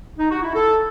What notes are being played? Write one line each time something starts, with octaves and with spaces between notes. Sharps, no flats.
D#4
F#4
E4
A4